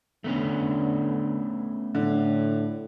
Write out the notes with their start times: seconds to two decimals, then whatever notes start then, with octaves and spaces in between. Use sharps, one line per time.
0.24 D3 A3 B3 C#4
1.95 A2 D3